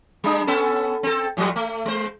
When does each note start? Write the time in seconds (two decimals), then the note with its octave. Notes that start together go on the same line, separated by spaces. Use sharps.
0.24 G3 D4
0.47 B3 C#4 A4
1.03 C4 A4
1.37 A2 F3 G3
1.56 A3
1.85 G#3 C5